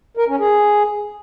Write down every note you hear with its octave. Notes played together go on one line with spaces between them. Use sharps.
A#4
C#4
G#4